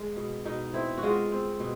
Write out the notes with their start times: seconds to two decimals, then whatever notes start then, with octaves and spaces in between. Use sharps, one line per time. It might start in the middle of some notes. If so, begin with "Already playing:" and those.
Already playing: G#3
0.17 B2
0.45 B2 D#4
0.74 C4 E4
0.98 F#4
1.03 G#3 F4
1.32 C4
1.60 B2